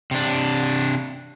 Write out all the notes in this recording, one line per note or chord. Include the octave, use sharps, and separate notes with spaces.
C3 D4